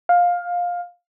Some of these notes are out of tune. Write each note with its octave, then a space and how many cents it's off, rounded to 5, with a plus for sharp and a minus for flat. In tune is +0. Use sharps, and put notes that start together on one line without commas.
F5 +15